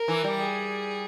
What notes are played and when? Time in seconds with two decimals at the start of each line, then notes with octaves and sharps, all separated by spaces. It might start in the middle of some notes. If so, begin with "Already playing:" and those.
Already playing: A#4
0.08 E3
0.24 G3
0.40 G#4